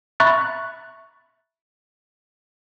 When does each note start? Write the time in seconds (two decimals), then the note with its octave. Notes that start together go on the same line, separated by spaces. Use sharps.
0.20 E5 A#5 B5 C#6 F#6 A6